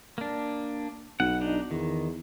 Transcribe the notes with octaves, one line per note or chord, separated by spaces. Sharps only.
A#3 D4
B1 F#5
D4 D#4
E2 D#3